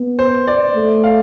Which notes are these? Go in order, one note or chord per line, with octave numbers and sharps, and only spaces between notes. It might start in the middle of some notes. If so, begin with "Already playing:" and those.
Already playing: B3
C5
D5
A3
F5